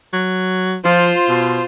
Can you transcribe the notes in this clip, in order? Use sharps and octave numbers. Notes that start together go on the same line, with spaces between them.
F#3
F3 F4 C5
B2